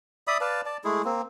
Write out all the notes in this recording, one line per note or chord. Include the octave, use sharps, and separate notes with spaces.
D5 E5 B5 D#6
B4 D5 F5 A5
D5 A5
G#3 A3 E4 G#4
A#3 C4